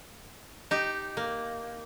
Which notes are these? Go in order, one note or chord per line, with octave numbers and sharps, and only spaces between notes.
D#4 G4
A#3